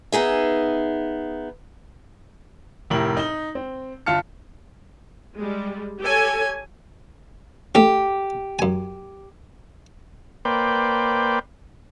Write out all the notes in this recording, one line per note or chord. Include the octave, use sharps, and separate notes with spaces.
B3 D#4 G#4 E5
F1 A2 E4 G4 A#4 F#7
D#4 G7
C4
G1 F4 F5 A5 F6 C#7
G3 G#3
G4 A4 C#5 G#5
A3 C#4 G4
F#2 G#5
A#3 B4 C5 D5 G5